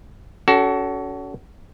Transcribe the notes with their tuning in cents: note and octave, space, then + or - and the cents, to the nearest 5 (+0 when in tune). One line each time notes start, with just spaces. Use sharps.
C#4 +35 F#4 +30 A4 +0